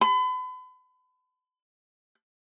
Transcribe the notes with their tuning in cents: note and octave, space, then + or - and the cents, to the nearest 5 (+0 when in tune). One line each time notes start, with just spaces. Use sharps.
B5 +40